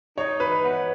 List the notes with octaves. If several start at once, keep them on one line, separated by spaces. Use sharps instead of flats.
D#4 C#5
E3 B4
B3